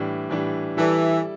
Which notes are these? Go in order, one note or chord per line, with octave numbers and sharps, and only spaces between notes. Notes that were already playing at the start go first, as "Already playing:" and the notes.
Already playing: A2 E3 G3 D4
A2 E3 G3 D4
E3 G3 E4 A4 D5